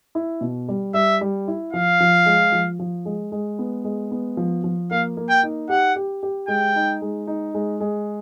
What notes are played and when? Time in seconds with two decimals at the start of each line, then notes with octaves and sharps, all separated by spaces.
0.15 E4
0.41 B2
0.68 G3
0.94 G3 E5
1.21 G3
1.48 E4
1.73 F3 F5
2.00 F3
2.26 G#3
2.52 F3
2.79 F3
3.05 G#3
3.32 G#3
3.59 B3
3.84 G#3
4.11 B3
4.37 F3
4.64 F3
4.91 A#3 F5
5.17 A#3
5.30 G5
5.43 D#4
5.69 G4 F#5
5.96 G4
6.23 G4
6.48 G#3 G5
6.76 D#4
7.02 G#3
7.27 D#4
7.54 G#3
7.81 G#3